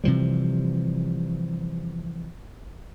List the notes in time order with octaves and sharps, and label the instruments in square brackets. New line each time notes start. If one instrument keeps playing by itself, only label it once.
[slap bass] C3 E3 F3 G3